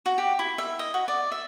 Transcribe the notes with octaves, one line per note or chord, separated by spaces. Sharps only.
F#4
G4
E4
E5
D#5
F#4
D5
E5